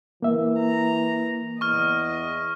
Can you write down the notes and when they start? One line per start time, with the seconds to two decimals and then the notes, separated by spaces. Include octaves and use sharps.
0.22 E3 A#3 E5
0.58 A#5
1.61 E2 D#5 C#6 F6